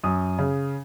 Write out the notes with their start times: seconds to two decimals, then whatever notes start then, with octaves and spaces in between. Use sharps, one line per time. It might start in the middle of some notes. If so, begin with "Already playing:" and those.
0.04 F#2 D#6
0.38 C#3